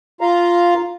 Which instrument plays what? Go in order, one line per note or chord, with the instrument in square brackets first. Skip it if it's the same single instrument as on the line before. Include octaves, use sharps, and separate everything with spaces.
[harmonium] F4 F5 A#5